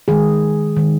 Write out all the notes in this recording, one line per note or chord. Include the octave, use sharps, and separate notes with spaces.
D#3 G#3 G#4
D#3 G#3